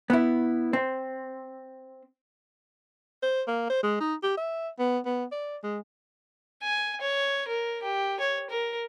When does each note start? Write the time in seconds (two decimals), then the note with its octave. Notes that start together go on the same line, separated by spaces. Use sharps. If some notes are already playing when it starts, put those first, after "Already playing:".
0.10 B3 E4
0.73 C4
3.23 C5
3.47 A#3
3.70 C5
3.83 G#3
4.00 D#4
4.23 G4
4.37 E5
4.79 B3
5.05 B3
5.32 D5
5.63 G#3
6.62 G#5
7.01 C#5
7.48 A#4
7.82 G4
8.20 C#5
8.50 A#4